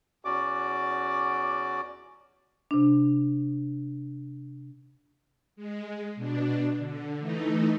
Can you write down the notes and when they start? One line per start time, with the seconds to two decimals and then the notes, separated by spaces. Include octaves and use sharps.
0.25 E2 C#4 F#4 D5 D6
2.71 C3 D4
5.56 G#3
6.16 B2 D4
6.78 D3
7.20 E3 A3 D#4